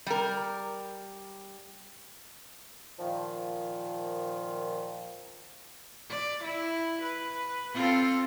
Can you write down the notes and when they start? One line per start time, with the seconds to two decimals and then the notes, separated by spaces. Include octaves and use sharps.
0.07 G3 A#4
2.99 A#2 D#3 F3
6.10 D5
6.44 E4
7.03 B4
7.74 C4 F4 A4